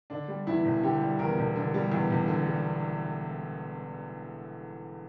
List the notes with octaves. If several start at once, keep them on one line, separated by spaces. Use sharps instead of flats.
D3 D4
G3
E2 E4
E1
D3 G4
G3
E2 A#4
E1
D3
G3
E2
E1
D3
G3